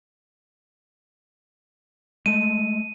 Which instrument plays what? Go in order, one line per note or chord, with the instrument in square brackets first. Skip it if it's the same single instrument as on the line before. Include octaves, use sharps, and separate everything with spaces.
[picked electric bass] G#3 A3 [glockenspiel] D#7